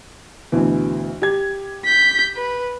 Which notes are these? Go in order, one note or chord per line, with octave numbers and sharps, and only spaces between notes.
D2 B2 E3
G4 G#6
G6 B6
B4